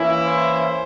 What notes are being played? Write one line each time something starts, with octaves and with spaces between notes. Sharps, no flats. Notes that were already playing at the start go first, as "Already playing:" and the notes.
Already playing: E3 A#3 C#4 E4
C5